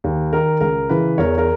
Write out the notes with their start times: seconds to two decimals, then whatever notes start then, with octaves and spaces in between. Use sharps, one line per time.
0.04 D#2
0.33 D#3 A#4
0.60 C#2 A#4
0.89 C#3 E3 B4
1.18 E2 A#4 C#5
1.38 A#4